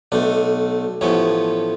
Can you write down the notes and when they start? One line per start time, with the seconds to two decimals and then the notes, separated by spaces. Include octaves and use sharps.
0.12 B1 B2 A3 D4
1.01 A1 A2 F3 B3 C#4